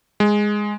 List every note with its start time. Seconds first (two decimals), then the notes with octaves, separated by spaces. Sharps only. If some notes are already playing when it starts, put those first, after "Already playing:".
0.20 G#3